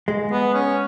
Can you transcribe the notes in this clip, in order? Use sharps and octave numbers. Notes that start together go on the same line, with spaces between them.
G#3
B3
C#4